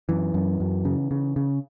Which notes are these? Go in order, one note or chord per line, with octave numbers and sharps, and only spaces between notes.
F#2 E3
F#2
F#2
C#3
C#3
C#3